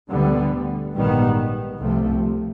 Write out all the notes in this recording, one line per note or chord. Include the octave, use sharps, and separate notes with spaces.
D2 D3 G3 B3
A#1 G#2 D#3 G3 B3
C2 C3 F3 A3